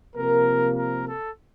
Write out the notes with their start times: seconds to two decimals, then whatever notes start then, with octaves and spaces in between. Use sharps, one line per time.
0.16 C3 F3 A#3 A#4
0.75 A#4
1.06 A4